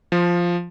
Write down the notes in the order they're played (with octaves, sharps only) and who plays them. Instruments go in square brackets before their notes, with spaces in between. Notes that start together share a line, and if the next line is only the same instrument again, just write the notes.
[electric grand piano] F3